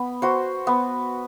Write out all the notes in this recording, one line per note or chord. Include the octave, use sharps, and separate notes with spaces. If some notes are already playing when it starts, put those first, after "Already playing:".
Already playing: B3
F#4 C5
B3